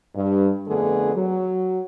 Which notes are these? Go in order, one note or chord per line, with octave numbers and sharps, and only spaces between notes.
G2
F2 D3 A3 B3 G#4
F#3